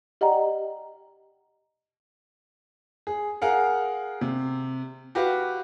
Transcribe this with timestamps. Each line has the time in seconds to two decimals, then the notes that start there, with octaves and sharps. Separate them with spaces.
0.21 G4 D5 D#5 F#5 G5 A#5
3.07 G#4
3.42 G#4 A#4 F5 F#5
4.21 C3
5.15 F#4 G4 B4 F5